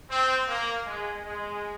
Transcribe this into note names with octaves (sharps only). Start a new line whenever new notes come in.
C4
A#3
G#3
G#3